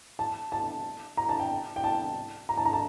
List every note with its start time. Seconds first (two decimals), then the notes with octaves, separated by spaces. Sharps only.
0.19 A5
0.52 A5
1.17 A#5
1.29 A5
1.40 G5
1.76 G5
1.84 A5
2.49 A#5
2.57 A5
2.65 A#5
2.73 A5